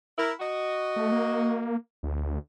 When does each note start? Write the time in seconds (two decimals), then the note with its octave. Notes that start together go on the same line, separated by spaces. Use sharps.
0.18 E4 A#4
0.40 F#4 D#5
0.96 A3
1.12 A#3
2.03 D2